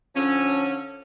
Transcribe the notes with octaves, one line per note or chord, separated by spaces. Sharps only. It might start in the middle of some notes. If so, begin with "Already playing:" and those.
D3 F3 C#4